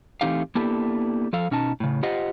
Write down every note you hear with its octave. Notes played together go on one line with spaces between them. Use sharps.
E3 A3 C4 D#4 G4 F5
A#3 B3 D4 E4 G4 A4
F3 A4 F5
B2 C#4 D#4 A5
A2 C#3
F4 G4 C5 D#5 F#5